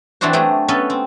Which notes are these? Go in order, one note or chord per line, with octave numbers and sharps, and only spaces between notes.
E3 F#3 C4 D4 F#4 C5
F#3 A3 G4 G#4
B3 C#4 A4 B4
C4